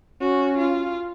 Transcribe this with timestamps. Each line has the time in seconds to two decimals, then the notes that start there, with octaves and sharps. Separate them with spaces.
0.21 C#4 F#4
0.58 F4